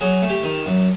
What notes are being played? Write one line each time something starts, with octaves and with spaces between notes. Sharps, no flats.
F#3 G#4
A3
G4
D#3
F#2